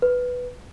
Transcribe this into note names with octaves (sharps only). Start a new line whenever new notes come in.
B4